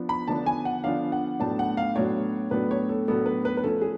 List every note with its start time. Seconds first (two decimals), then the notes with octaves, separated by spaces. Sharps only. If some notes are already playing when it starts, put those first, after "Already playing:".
Already playing: F3 B3 D4
0.09 B5
0.28 D3 F3 B3 D4 A5
0.46 G#5
0.65 F#5
0.84 D3 F3 B3 D4 F5
1.12 F#5
1.40 A2 F#3 B3 D4 A5
1.59 F#5
1.77 F5
1.95 A2 F#3 B3 D4 C#5
2.51 A2 F#3 B3 D4 B4
2.71 C#5
2.89 A4
3.08 A2 F#3 B3 D4 A4
3.26 B4
3.45 B4
3.57 B4
3.63 F3 A3 C#4 A4
3.82 G#4